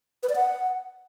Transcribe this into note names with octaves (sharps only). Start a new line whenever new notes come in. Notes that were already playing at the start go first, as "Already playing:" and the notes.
B4
D5
F#5